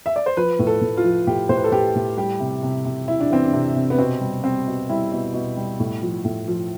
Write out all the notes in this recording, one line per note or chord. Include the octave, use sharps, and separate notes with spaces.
E5
D5
C5
F3 B4
A2
A4
A2
F4
F3
A2 G4
A2 C5
B4
A4
A2 G4
A2
G3 G4
C3
C3
C3
C3 E4
D4
E3 C4
D4
C3
C3
B3
B2 C4
G3
G3 C4
B2
G3 E4
B2
B2
G3
A2
F3
A2
F3